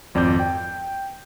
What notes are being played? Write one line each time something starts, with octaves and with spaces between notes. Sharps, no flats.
G#1 F2 D5 D6 G6
G5